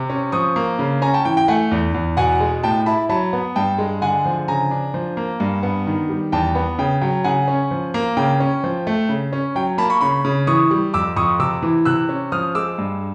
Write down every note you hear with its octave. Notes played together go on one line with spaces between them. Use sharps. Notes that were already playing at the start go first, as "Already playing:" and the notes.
Already playing: C3
C#4
F3 C#6 D#6
A#3
C#3
C#4 G#5 A#5
G5 A5
E3 G5
G5
A3 F#5 G#5
E2
E2
B2 F#5 G#5
G#3
A2 G5 A5
E4 A5 B5
F#3 A5 B5
B3
G2 G5 A5
G#3
D3 F#5 G#5
F3
C#3 G#5 A#5
D4
F3
A#3
G2
B3
D#3
G3
E2 G5 A5
B3
C#3 G5
F#3 G5
C#3 F#5 G#5
C#4
F3
A#3
C#3 G5
C#4
F3
A3
C#3
C#4
F#3 G5
A#3 A5 B5
B5 C#6
C#3 B5 C#6
C#3
E3 C#6 D#6
G3
F2 D6 E6
F2 C#6 D#6
C3 D6 E6
E3
C3 E6 F#6
C#4
F3 D#6 F6
G#3 D6 E6
G2